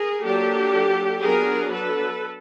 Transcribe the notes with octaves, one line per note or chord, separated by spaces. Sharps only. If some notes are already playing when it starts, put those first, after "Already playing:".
Already playing: G#4 A#4
F#3 A#3 D4 G4 A4
F#3 B3 D4 G#4 A#4
A4 B4